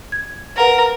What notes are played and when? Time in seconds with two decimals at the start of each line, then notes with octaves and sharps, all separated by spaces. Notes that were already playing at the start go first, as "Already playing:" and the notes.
0.12 G#6
0.57 A#4 B4 F5 F#5